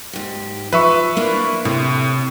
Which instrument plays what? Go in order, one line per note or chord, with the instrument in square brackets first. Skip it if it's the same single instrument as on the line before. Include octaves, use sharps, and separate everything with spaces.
[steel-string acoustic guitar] G#2 G4
[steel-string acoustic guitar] F3 [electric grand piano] B4 E5 C#6
[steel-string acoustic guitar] A#3 D4 E4
[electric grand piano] A2 [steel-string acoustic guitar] C3